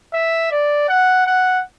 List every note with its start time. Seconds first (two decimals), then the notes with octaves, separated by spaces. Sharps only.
0.13 E5
0.51 D5
0.89 F#5
1.27 F#5